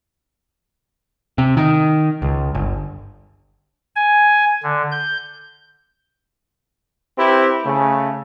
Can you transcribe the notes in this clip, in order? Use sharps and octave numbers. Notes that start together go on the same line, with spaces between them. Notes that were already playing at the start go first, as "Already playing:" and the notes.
C3
D#3
C#2
G1
G#5
D3
G6
C4 E4 G4 B4
C#3 A3